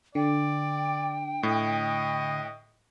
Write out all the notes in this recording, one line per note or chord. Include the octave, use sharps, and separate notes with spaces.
D3 D5 G5
A2 D#5